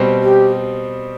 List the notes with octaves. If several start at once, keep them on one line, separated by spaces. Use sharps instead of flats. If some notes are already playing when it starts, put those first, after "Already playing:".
Already playing: B2 G3 C4
G4